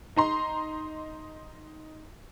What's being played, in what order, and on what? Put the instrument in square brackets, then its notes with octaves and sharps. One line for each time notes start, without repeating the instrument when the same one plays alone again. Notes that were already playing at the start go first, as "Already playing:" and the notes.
[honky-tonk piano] D#4 A#5 C6